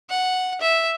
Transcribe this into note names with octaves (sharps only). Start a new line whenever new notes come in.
F#5
E5